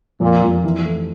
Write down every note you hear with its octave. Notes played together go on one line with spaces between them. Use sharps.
F2 A#2
F2
E3
A3